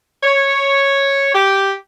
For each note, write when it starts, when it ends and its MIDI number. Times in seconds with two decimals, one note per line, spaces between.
0.22 1.31 73
1.34 1.72 67